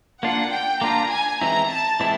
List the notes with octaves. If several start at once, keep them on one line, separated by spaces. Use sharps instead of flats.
A#3 D4 F4 F#5
G5
A#3 D4 F4 A#5
G#5
E3 G#3 C4 E4 A#5
A5
E3 G#3 C4 E4